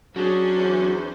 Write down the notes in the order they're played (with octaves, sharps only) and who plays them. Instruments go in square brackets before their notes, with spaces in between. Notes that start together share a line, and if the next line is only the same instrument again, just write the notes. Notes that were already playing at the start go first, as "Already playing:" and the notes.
[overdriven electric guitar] F#3 [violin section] C#4 [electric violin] D4 C5 [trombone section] G#4
[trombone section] E2